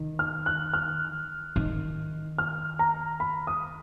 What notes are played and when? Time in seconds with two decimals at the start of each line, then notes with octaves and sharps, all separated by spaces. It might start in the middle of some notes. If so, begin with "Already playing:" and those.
Already playing: D#3
0.19 F6
0.46 F#6
0.73 F6
1.56 D#3
2.38 F6
2.79 A#5
3.20 B5
3.47 D#6